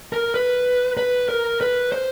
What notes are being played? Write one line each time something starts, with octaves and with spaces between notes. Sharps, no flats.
A#4
B4
B4
A#4
B4
C5